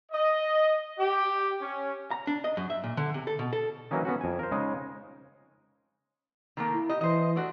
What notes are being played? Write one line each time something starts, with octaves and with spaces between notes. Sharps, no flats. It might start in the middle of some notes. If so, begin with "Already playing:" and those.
D#5
G4
C#4
A#5
D4
D#5
F#2
E5
A#2
D3
C3
A4
B2
A4
E3 F#3 A#3 C#4 D#4
B3 C#4 F#4
F2 G#5
A#4 C5
C#3 G#3 D#4
D#3 A3 A#3
E4
G4 D#5
E3 C5 D#5
A3 D4 F#4